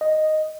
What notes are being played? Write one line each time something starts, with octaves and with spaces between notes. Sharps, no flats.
D#5